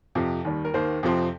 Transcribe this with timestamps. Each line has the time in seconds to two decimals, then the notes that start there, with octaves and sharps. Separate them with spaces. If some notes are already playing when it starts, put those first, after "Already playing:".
0.15 F2 C3 F3
0.45 D#2 D#3 G3
0.65 A#4
0.74 D#2 D#3 A#3 C5
1.03 F2 C3 F3 C4